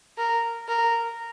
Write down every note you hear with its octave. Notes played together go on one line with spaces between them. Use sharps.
A#4
A#4